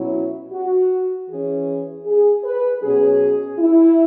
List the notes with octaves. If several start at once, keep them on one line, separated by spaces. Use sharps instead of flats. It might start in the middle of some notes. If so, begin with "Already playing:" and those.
Already playing: B2 F#3 C#4 E4
F#4
E3 C#4 G#4
G#4
B4
B2 F#3 C#4 G#4
E4